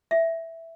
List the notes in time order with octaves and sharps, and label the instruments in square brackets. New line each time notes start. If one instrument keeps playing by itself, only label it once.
[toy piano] E5